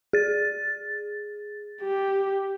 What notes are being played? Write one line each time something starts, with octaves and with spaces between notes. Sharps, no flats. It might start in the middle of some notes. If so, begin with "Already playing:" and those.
G#4 A6
G4